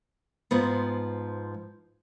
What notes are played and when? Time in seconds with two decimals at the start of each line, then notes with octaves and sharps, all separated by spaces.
0.51 G#2 F3 B3